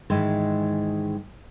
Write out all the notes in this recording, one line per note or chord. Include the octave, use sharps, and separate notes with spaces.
G#2 D#3 E3 G#3